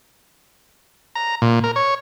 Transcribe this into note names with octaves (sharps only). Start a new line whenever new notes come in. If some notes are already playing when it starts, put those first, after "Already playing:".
A#5
A#2
A#4
C#5